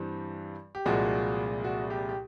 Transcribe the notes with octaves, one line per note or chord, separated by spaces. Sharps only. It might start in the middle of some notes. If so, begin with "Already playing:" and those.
Already playing: G2 E3 G3 C4
G4
C2 A#2 F3 G#3 F#4
F#4
G4
G4